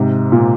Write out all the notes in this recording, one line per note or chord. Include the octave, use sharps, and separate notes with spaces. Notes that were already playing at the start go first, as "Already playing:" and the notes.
Already playing: G#2 C3
A#2